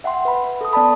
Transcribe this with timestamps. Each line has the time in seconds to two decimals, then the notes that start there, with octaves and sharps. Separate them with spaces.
0.04 E5 F#5 G5 C6
0.25 B4 B5
0.61 A4 D#6
0.73 B3 D5 A5 B5